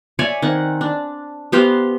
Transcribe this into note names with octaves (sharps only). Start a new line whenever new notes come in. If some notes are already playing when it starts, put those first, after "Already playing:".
C#5 D5 E5 G#5
D#3 C4 F#5
D4
B3 G4 C5 F5